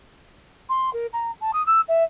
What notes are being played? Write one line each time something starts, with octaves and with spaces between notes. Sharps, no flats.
C6
A#4
A#5
A5
D#6
E6
E5